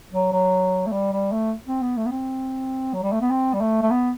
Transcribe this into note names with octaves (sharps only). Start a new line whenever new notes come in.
F#3
F#3
A3
G3
G3
A3
C4
B3
A3
B3
C4
F#3
G3
A3
B3
C4
G3
A3
A3
B3